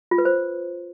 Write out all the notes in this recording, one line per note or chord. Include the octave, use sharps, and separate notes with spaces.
F4
B4
C5